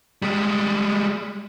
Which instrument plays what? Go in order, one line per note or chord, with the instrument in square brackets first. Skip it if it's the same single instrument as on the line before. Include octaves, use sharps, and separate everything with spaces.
[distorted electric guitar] G3 G#3